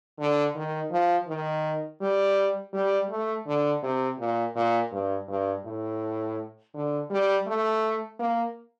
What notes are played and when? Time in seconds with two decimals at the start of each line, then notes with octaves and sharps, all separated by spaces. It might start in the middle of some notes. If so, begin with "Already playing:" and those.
0.19 D3
0.55 D#3
0.91 F3
1.28 D#3
2.01 G3
2.73 G3
3.10 A3
3.47 D3
3.83 C3
4.19 A#2
4.56 A#2
4.92 G2
5.28 G2
5.65 A2
6.74 D3
7.10 G3
7.47 A3
8.19 A#3